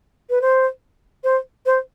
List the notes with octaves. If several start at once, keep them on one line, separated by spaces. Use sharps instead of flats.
B4
C5
C5
C5